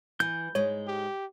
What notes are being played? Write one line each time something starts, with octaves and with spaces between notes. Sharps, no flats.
E3 G6
G#2 G#3 C#5
G4